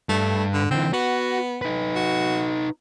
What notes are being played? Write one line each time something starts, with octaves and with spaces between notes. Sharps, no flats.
G2 A3
D3
D3 E3 C4
B3 F#4
D#4 B4
F#4